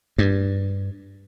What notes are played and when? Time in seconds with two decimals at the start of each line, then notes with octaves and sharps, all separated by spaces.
0.18 G2